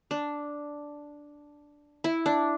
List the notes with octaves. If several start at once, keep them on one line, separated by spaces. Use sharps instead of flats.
D4
E4
D4